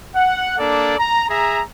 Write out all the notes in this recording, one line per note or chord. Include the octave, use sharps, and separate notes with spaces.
F#5
A#3 D4 A4 D5
A#5
G#4 E5 A#5